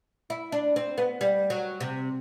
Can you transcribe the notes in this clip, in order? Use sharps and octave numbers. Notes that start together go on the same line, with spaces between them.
E4
D4
C4
B3
G3
F#3
C3